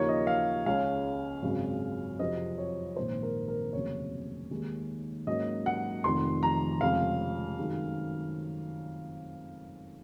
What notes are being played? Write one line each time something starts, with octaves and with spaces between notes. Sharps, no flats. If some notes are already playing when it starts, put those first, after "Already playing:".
Already playing: D#2 C#3 F3 A#3 D#4 C#5
D#5
F5
C#2 C#3 G#3 C#4 F5
G#1 F#2 C#3 G#3
F2 C3 F#3 C4 D#5
C#5
A#1 G#2 D#3 C5
A#4
A#4
F1 D#2 C#3 F#3 C4 C#5
D#2 D#3 G#3 D#4
G#2 F#3 A#3 C#4 D#5
F#5
F1 F2 D#3 C6
A#5
F1 F2 C#3 G#3 F5
F#2 D#3 G#3